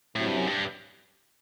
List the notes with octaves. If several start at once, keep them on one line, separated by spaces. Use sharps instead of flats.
A2 C3 F#3 C4 E4 G4
G2
F#2
G2